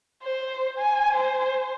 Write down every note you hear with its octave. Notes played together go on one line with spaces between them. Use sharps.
C5
G#5
C5